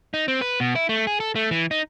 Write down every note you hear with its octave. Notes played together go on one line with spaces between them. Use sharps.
D#4
C4
B4
B2
E4
A3
G#4
A4
A3
E3
D#4